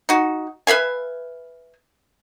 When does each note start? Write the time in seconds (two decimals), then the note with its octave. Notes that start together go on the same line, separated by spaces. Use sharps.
0.09 D#4 F#4
0.67 B4 E5 F5 G#5